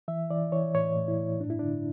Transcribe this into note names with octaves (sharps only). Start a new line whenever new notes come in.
E3 E5
E3 D5
E3 C#5
A2 C#5
A2
E4
A2
G2 D4
E4
D3 D4